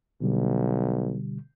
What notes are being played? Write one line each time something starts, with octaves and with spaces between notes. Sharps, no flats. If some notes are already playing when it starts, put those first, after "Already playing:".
B1 B2 D3 G3